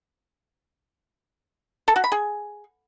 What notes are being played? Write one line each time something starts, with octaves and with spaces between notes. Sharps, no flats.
A4
F#4
B5
G#4